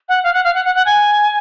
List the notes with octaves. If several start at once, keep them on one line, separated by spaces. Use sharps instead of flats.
F#5
F5
F#5
F5
F#5
F#5
F#5
G#5